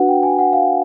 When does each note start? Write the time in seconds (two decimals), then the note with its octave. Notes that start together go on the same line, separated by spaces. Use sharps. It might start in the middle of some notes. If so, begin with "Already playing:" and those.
Already playing: D4 F#4 B4 F#5
0.08 G5
0.23 G#5
0.39 F#5
0.53 F5